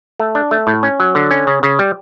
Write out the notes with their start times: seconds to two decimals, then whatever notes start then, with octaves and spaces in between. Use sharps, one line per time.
0.20 A3
0.35 D4
0.51 A3
0.67 A2
0.83 C#4
1.00 F#3
1.15 D3
1.31 C#4
1.47 C#3
1.63 C#3
1.79 G3